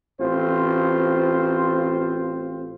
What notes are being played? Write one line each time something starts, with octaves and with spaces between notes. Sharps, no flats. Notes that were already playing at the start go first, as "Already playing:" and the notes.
A1 C4 F4 C5